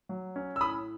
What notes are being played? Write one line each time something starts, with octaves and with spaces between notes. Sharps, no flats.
F#3
C#4
E6
A2 B5 D#6